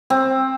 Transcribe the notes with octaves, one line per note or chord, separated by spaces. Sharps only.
C4